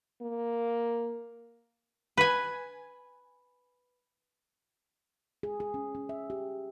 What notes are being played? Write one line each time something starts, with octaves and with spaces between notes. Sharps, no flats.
A#3
B4 G#5
G#4
G#4
C#4
C#4
E5
G4